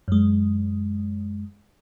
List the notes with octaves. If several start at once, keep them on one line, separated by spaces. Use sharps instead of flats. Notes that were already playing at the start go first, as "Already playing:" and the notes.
F#2 G#3